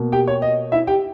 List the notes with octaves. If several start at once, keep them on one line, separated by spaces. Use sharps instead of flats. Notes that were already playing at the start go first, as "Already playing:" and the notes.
Already playing: B2 A#3
G4 G5
C#5
D#5
E4 E5
G4 G5